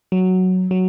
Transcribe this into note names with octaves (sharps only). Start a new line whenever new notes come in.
F#3
F#3